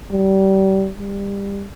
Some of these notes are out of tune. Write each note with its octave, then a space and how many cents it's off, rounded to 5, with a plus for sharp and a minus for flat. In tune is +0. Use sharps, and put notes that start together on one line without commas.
G3 -30
G3 +25